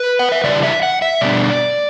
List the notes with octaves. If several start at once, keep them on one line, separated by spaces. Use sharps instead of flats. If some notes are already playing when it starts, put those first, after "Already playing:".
Already playing: B4
F#5
E5
C#3 E3 G3 D4 D5
E5
F#5
E5
B2 G3 B3 D4 D5